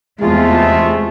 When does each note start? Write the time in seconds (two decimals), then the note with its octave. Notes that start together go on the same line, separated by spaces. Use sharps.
0.21 E2 C3 G#3 A3 F4